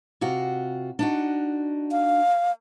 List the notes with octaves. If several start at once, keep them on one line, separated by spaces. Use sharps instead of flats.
C3 F4 F#4
D4 D#4 F#4
F5